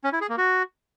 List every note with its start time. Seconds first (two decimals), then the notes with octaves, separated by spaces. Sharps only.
0.04 C#4
0.13 E4
0.21 G#4
0.29 A#3
0.38 F#4